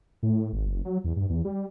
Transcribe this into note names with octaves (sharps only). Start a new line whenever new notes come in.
A2
G#1
F#1
F#3
E2
G2
E2
G3